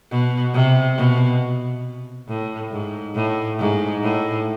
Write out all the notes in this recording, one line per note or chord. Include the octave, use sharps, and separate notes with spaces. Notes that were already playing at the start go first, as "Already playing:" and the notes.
B2
C3
B2
A2
G#2
A2
G#2
A2